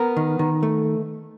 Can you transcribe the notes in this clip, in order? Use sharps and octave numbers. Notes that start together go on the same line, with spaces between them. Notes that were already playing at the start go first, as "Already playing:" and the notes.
Already playing: B3 A#4
D#3
D#3
A3